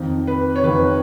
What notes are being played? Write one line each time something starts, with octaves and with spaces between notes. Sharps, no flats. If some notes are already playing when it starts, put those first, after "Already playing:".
Already playing: F2 D#3
B4
C#5
F2 D#3 B4